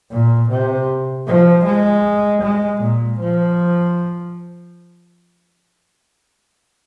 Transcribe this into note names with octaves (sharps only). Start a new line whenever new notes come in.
A#2
C3
F3
G#3
G#3
A#2
F3